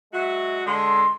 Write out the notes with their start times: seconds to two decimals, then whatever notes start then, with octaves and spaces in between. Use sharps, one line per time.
0.13 F#3 G#3 F#4 E5
0.66 D3 G#3 C6